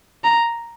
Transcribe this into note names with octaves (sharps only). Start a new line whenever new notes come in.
A#5